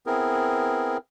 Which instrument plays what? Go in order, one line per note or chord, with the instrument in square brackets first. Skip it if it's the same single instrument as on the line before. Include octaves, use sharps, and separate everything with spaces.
[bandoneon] B3 C4 E4 G#4 A#4